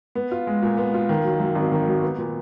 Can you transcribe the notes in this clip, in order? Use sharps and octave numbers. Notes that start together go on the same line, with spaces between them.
B3
F4
G#3
A#2
B3
F4
D#3
F#3
F#2
G#1
D#3
F#3
B3
A#2